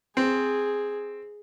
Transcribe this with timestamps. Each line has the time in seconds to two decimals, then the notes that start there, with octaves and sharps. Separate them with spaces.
0.17 C4 G#4